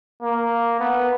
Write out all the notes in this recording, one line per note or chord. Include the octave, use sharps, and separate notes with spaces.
A#3
B3